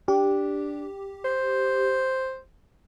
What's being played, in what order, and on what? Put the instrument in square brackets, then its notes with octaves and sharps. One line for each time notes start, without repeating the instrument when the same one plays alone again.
[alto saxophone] D4 [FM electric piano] G4
[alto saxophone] C5